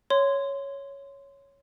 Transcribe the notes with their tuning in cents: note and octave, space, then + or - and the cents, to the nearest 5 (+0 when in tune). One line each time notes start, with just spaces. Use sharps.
C#5 +0 C6 -15